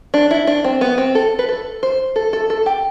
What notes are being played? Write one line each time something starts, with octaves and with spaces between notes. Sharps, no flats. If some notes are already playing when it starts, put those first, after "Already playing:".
D4
E4
D4
C4
B3
C4
A4
B4
A4
C5
A4
A4
A4
G4